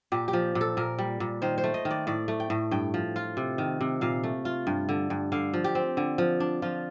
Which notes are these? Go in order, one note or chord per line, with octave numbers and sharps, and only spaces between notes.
A#2 G4
G4
F3
A#2
A4
A#2 A#4
G3
A#2
D#3 C5
C5
A3
D#5
D#3
D5
A2 D5
A3
G5
A2
G2 G5
F3
F4
C3
D#3
C3
A#2 F5
A3
F4
G2
D3
G2
D3 F5
F3
G4
C4
D3
F3
D4
F3 F4